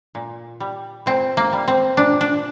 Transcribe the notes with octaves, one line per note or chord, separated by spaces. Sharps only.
A#2
G3
A#2 C4
A#3
G3
C4
A#2 D4
D4